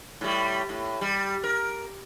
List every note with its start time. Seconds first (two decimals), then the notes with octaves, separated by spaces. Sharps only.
0.21 A2 G3
0.69 A2
1.01 G3
1.44 A#4